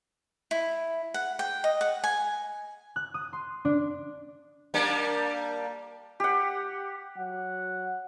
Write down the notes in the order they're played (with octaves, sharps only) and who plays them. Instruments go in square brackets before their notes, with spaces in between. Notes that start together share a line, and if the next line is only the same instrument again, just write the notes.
[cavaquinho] E4
F#5
G5
D#5
F#5
G#5
[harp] F#6
D#6
C6
D4
[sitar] G3 A#3 D4
[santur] G4 F#5
[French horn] F#3 [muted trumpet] F#5